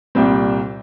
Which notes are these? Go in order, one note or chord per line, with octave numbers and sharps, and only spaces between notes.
C2 A#2 G3 C4